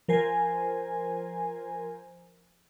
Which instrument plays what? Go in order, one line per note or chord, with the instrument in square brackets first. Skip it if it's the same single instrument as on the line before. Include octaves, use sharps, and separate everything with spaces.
[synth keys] F3 A#4 C5 G#5